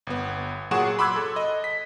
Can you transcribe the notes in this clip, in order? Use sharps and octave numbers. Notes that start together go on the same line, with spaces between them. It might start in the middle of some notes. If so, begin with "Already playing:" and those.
G1 B3
A#2 F#3 G#4 F#5 C#6 E7
B5 C6 D6 E6 F#6 G#6
A4
D#5
B6